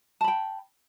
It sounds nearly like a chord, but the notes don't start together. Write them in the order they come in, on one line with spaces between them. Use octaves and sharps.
A5 B5 G5